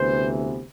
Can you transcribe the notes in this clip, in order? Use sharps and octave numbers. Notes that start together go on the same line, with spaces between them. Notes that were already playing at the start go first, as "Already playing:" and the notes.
Already playing: D2 C3 E3 B3 C5